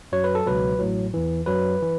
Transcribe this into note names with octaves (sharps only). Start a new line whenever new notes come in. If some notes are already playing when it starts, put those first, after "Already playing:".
F#2 F#3 C#5
B4
A4
C#2 B2 F#3 B4
A1 A2 F#3
E2 E3
F#2 F#3 B4
E3